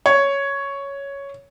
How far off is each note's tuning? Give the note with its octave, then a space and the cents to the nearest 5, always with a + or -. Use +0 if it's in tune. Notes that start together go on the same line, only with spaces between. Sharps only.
C#5 +5